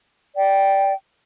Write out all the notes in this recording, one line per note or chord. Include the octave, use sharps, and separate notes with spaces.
D5 G5